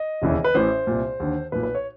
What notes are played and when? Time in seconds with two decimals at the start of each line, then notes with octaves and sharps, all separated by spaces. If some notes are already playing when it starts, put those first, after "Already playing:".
Already playing: D#5
0.22 E1 D#2 C#3 E3
0.44 B4
0.54 A1 A2 E3 C5
0.87 C2 A#2
1.20 D#2 D3
1.52 B1 A#2 B4
1.63 B4
1.75 C#5